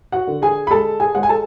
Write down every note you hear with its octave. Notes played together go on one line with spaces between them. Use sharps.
F#4 F#5
D3
G#4 G#5
B5
G#3 A4 A5
G#4 G#5
G#3 F#5
G#5
A4 A5